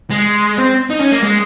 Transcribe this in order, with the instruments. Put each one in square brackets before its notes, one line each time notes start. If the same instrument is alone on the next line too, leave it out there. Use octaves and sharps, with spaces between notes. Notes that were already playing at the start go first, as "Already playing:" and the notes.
[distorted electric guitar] G#3
C4
D#4
C#4
A#3
G#3